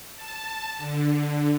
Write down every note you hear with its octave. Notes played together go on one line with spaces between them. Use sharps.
A5
D3